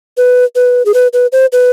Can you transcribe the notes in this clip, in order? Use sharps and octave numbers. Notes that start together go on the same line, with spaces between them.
B4
B4
G#4
B4
B4
C5
B4